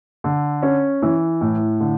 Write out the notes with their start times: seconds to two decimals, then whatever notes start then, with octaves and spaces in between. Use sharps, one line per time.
0.24 D3
0.62 C#4
1.02 E3
1.41 A2
1.80 D3